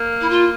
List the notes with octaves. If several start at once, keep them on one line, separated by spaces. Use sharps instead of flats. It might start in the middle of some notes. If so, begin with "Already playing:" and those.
Already playing: A#3
E4
F4